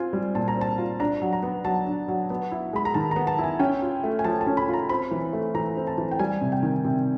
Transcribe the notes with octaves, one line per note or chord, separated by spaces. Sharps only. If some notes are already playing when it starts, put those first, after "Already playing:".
Already playing: C4 F4 G#5
G3
A#2 A5
A#5
C4 A5
F4
D4 A#5
F#3
A#5
B3
F#3 A5
D4
F#3
B3
E4
G#3 B5
A#5
D#3 A5
B3 A#5
A5
E4
G#5
C#4 G5
F4
A3
G#5
F3 A5
A5
C#4
B5
F4
A#5
C4 B5
E3
A3
E3 A#5
C4
A5
E3
G5
G3 G#5
C3
G5
D#3
C3